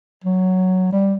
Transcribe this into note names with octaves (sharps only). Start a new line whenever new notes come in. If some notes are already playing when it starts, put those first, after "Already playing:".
F#3
G3